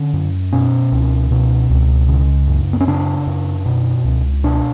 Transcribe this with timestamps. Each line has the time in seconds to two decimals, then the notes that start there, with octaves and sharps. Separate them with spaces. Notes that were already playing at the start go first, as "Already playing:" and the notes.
Already playing: D3 C#4
0.13 F#2
0.52 B2 C#4
0.92 C#2
1.31 B2
1.70 C#2
2.09 C#3
2.48 F#2
2.73 B3
2.80 C#4
2.87 C#3 D4
3.27 F#2
3.66 B2
4.05 C#2
4.44 B2 D4